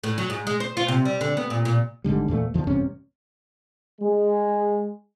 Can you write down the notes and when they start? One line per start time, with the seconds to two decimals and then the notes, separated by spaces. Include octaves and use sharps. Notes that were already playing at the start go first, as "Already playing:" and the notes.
0.04 A2
0.18 F#3
0.30 G#2
0.47 G#3
0.60 C5
0.77 F4
0.88 C3
1.05 G3
1.21 D3
1.37 B3
1.50 A#2
1.65 A#2
2.04 G#1 G#2 D3 G3
2.28 E2 A#2 A3
2.54 E2 D#3 F3
2.67 A1 G2 C3 C#4
4.02 G#3